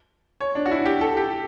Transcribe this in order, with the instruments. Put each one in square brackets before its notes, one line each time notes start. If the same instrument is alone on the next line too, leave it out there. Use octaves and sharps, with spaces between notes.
[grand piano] C#5
D4
F#4
E4
G4
A4
G4